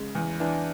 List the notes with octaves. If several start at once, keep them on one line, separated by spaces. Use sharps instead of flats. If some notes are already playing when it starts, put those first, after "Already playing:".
Already playing: C#3 G#3
E2
E3 D4